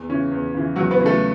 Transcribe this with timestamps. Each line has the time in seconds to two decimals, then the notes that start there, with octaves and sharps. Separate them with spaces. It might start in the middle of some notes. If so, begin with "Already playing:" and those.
Already playing: E2
0.09 C#3 E3 C#4
0.31 E2
0.54 C#3 E3
0.76 E2 F#3 F#4
0.91 B3 B4
0.99 C#3 E3
1.06 A3 A4